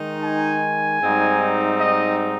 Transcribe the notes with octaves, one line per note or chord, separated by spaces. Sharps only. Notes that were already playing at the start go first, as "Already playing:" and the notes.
Already playing: D#3 G#3 D#4
G#5
G#2 G3 C4 D#4
D#5